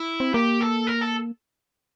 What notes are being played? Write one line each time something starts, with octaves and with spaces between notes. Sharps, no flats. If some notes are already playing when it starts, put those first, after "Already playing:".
Already playing: E4
C4
A#3 G4
A4
A#4
A4